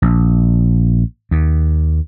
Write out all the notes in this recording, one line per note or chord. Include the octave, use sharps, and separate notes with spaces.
A#1
D#2